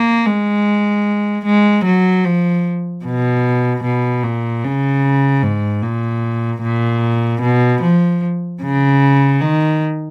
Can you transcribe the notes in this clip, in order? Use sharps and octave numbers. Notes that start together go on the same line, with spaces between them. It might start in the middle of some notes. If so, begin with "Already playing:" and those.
Already playing: A#3
G#3
G#3
F#3
F3
B2
B2
A#2
C#3
G#2
A#2
A#2
B2
F3
C#3
D#3